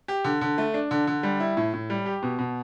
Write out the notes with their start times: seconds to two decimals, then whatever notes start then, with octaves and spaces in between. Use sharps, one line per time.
0.08 G4
0.24 D3
0.41 D3
0.58 A3
0.74 D4
0.91 D3
1.07 D3
1.23 G3
1.40 E4
1.57 A2
1.73 A2
1.90 G3
2.06 G4
2.23 B2
2.39 B2